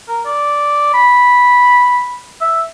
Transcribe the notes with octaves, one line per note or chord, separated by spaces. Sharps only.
A#4
D5
B5
E5